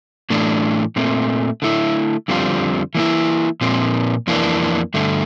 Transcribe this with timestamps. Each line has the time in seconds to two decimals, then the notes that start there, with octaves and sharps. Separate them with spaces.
0.30 A2 E3 A3 D4
0.96 A#2 A3 C4
1.62 D3 A3 E4
2.28 F2 D3 G3 C4 F4
2.95 E3 A#3 E4
3.61 A#2 F3 C4
4.27 F2 E3 A#3 D4
4.94 G2 D3 A3